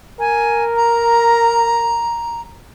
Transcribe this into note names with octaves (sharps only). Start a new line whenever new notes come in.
A#4 G#5
A#5